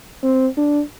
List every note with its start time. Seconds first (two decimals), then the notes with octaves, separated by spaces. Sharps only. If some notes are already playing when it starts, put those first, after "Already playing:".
0.23 C4
0.57 D4